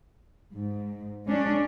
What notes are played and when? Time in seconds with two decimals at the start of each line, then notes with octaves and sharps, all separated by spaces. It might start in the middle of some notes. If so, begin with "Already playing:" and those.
0.52 G#2
1.25 G#3 C#4 D4